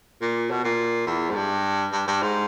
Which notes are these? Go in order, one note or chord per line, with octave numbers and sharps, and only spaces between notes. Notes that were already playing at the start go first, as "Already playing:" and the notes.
A#2
B2
A#2
E2
G#2
G2
G2
G2
G#2